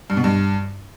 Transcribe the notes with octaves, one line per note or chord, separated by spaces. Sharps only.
G2
B2
G2